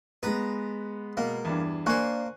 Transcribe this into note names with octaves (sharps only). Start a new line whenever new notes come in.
G#3 B3 B4 A#5
B2 A#3
E2 G2
A#3 D4 C5 G#5 C#6 F#6